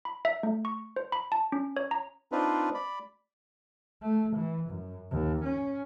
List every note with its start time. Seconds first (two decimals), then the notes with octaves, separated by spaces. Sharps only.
0.05 B5
0.25 E5
0.43 A3
0.65 C#6
0.96 C5
1.12 B5
1.32 A5
1.52 C#4
1.77 C#5
1.91 A#5
2.32 C4 D4 D#4 F4 B4
2.74 D5 B5
4.02 A3
4.36 E3
4.70 F#2
5.11 D#2
5.45 C#4